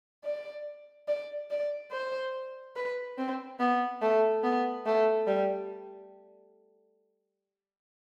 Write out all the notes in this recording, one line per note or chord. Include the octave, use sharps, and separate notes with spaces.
D5
D5
D5
C5
B4
C4
B3
A3
B3
A3
G3